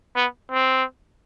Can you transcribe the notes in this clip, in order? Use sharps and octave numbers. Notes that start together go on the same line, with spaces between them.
B3
C4